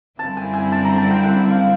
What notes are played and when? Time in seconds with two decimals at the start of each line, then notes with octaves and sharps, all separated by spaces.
0.19 F#2 D3 G3 C4 E4 A5
0.37 G#5
0.54 G#5
0.72 A5
0.85 A#5
0.98 A5
1.11 G5
1.24 F#5
1.51 F5